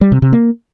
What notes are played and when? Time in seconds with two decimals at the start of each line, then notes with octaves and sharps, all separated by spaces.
0.01 G3
0.12 C3
0.22 C3
0.33 A#3